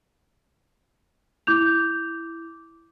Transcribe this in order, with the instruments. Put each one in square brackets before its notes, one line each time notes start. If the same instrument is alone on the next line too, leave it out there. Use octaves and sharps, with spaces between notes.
[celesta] E4 D6 G6 F7